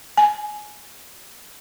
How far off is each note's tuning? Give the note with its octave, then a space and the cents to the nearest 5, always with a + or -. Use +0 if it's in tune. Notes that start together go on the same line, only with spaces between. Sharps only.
G#5 +15